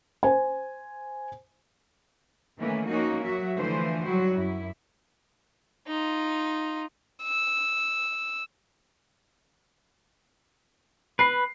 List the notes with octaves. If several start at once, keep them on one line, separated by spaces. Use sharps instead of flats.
C5 G#5
D#3 E3 A3 A#3 C#4
F3 A#3 C#4 D#4 F#4
F#3 F#4 E5
D3 E3 F3 A3 B4 C5
F#3 G3 E4 F#4
F#2 E4
D#4 F4
E6
B4 B5 C7